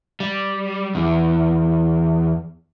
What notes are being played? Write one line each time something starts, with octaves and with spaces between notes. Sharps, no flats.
G3
E2